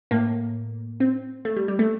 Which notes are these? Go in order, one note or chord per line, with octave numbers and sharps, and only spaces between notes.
A2 A#3
C4
A3
G3
G3
A3